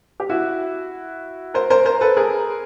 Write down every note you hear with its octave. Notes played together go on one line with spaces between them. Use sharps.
G4
E4 F#4
A#4 C5
A#4 C5
A#4 C5
A4 B4
G#4 A#4